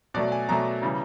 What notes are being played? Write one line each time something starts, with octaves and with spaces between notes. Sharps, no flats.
B2 F#3 A3 D5
G#5
B2 F#3 A3 A#5
C#3 E3 G3